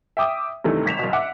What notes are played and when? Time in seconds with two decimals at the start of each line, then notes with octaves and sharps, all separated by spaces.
0.17 E5 G5 D6 D#6
0.64 G2 C3 D#3 E3 A3
0.86 G#1 B6 E7 F7
0.99 F#1 B2
1.13 E5 F#5 D6